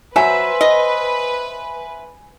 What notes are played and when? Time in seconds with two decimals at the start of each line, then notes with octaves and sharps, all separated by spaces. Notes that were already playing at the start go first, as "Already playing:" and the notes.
0.16 F#3 B4 C5 E5 G#5
0.61 D#5